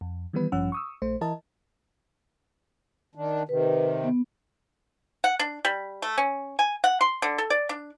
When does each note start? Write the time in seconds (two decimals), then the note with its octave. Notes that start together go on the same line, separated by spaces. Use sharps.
0.01 F2
0.33 D#3 E3 G3 B3 B4
0.52 A1 G2 F3 C#4 F#5 E6
0.72 C#6 D#6 E6
1.02 A#1 A3 C5
1.21 E3 E4 A#4 D#5 A5
3.15 D#3 D4
3.49 C3 D#3 B4
4.04 B3
5.24 F#5
5.39 D4
5.65 G3
6.02 A3
6.18 C#4
6.59 G#5
6.84 F#5
7.01 C6
7.22 D3
7.38 A4
7.50 D5
7.69 D4